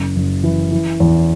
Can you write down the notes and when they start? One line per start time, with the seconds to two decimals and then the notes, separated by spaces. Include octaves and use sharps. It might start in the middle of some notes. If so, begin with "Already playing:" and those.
Already playing: F#1
0.16 F#1
0.44 E3
0.72 E3
1.00 E2